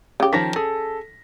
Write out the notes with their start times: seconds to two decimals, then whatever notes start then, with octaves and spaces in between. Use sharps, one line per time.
0.20 C#3 G4
0.33 D#3 F3 A#5 A#6 B6
0.56 G#4 A4